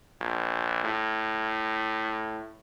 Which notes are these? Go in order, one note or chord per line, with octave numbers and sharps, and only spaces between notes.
A#1
A2